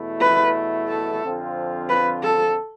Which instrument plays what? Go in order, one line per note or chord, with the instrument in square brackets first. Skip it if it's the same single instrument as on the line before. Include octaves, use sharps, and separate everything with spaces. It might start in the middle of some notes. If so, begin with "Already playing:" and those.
Already playing: [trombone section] E2 B2 A3 E4
[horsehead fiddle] B4
A4
[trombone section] F2 D3 F3 C4 F4
[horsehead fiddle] B4
A4